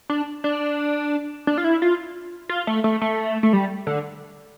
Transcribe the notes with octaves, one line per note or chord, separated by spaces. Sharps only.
D4
D4
D4
F4
E4
F4
F4
A3
A3
A3
A3
G3
D3